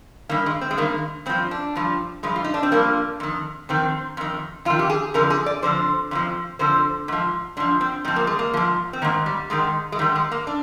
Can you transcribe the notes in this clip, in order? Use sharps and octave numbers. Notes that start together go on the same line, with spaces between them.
G2 D#3 A#3
G#3
C4
G#3
G2 D#3 A#3
G2 F3 C4
D4
G2 F3
G2 F3 G#3
F4
D#4
D4
C4
G2 F3 A#3
F2 D#3
F2 D#3 C4
F2 D#3
F2 D#3 F4
G4
G#4
F2 D3 F3 A#4
G#4
D5
F2 D3 F3 C5
F2 D3 F3
F2 D3 F3 C5
G#2 F3
G#2 F3 D4
C4
G#2 F3 C4
A#3
G#3
A#3
G#2 F3
C4
G#2 D#3 A#3
G3
G#2 D#3 G#3
G#3
G#2 D#3 G3
G#3
A#3
D4